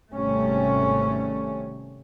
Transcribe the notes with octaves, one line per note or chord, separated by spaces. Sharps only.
G#1 C3 G3 A3 C#4